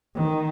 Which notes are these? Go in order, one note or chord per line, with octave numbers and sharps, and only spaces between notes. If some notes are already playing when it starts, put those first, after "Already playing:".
D#3